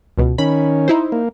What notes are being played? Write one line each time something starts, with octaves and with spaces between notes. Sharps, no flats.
C#2 B2
D#3 C#4 B5
D#4 E4 C5
A#3